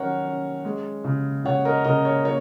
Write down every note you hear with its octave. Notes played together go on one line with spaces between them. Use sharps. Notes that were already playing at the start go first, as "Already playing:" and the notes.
Already playing: D#3 F#3 C#4 A#4 C#5 F#5
C#4
G#3
C#3
C#3 C#5 F#5
A#4 D#5
C#3 A#4 D#5
C#5
A#3 C#5